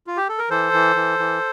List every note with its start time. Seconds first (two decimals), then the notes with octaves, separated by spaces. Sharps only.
0.07 F4
0.17 G4
0.29 A4
0.39 A#4
0.50 E3 A4 C5
0.73 E3
0.96 E3
1.19 E3